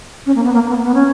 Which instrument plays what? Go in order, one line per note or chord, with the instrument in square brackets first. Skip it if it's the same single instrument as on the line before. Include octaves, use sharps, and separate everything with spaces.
[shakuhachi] C#4
A#3
B3
A#3
B3
B3
C#4